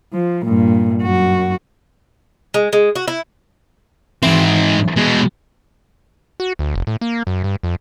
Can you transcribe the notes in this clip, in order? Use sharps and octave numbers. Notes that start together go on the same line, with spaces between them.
F3
G2 A#2
F#2 F#4
G#3
G#3
F#4
E4
G#2 E3 C4
B2 G#3
F#4
D2
F1
A2
A#3
F#2
G2
F2